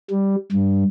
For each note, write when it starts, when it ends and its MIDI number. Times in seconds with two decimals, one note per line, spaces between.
0.10 0.36 55
0.52 0.84 43